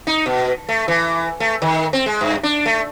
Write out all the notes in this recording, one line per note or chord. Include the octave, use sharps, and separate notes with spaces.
D#4
B2
A3
E3
A3
D#3
C4
G#3
G2
D4
A3